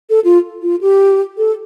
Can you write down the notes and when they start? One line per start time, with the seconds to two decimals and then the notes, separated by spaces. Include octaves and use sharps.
0.10 A4
0.25 F4
0.62 F4
0.81 G4
1.38 A4